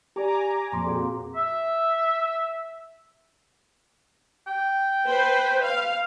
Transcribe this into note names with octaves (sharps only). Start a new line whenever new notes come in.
G4 D5 G#5 A#5 D6
F2 A#2 A#5 C6 D6
F#4 G#4
E5
G5
B4 C5
F5